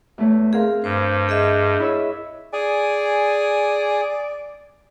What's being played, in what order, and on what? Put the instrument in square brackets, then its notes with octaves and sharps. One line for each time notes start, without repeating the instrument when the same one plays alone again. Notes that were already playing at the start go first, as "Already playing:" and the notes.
[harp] E2 A3 C#5
[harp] C4 A#4 F5 [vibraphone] G#4
[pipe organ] G2 [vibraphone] C5
[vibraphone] G#4 D#5 E5
[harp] E4 C#5 E6
[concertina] G#4 G#5 [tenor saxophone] D5